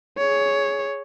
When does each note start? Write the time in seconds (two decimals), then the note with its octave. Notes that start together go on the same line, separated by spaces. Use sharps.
0.18 G#4 C#5